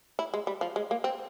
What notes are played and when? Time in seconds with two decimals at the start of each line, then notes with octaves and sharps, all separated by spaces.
0.19 E4
0.34 G#3
0.47 G3
0.61 F3
0.76 G#3
0.91 A#3
1.04 C4